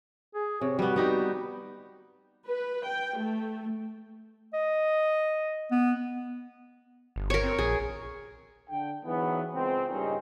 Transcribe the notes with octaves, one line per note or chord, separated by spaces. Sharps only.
G#4
C3 C#5
G3 B3 F#4
B3 D#4 G4
B4
G5
A3
D#5
B3
G1
A#4 C#5
C4
A#1 G#4
D3 G5
E2 G#2 E3 F#3 B3
C#2 C4
G2 A#2 C#3 C4 C#4 D#4